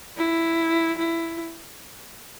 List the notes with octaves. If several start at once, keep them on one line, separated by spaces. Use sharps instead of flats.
E4
E4